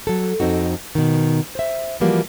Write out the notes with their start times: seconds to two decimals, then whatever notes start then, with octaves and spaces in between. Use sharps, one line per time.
0.07 F#3 A4
0.40 F2 C4 D#4 F#4
0.95 B2 D#3
1.55 C5 E5
2.00 E3 F3 G3 A#3 F4 F#4